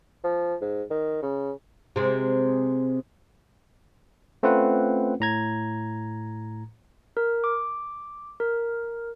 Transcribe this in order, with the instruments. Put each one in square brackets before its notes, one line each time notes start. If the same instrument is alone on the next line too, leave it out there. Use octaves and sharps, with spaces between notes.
[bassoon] F3
G#2
D#3
C#3
[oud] C3 G#3
[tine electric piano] A3 C4 C#4 F4 B4 F#5
A2 A#5 G#6
[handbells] A#4
D6
A#4